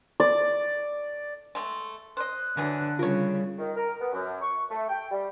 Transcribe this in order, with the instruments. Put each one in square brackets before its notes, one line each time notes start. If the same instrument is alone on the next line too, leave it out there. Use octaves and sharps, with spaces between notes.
[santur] D5
[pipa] G#3 A3
[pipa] C5 D#5 [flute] F#6
[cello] D3 [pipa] E3 F#3 G#4
[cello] C#3 G3 [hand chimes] F4 [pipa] A#4 C#5
[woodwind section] D#3
A#4
B3
F#2
C#6
A3
G5
G3